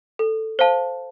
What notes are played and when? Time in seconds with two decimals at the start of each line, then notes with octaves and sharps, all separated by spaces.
0.19 A4
0.59 C5 F5 A5